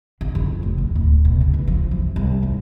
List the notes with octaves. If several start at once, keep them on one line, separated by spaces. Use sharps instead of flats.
D3
F2
F1
D3
D1
B2
C#3
E3
F3
F#2
C2
G#2